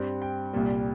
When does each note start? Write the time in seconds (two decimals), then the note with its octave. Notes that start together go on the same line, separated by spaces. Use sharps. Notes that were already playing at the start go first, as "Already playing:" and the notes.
Already playing: G2 G3 C4 G5
0.22 G5
0.53 C2 A#2 G3